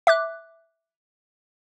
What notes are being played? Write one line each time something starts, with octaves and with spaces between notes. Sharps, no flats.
E5 D6 F#6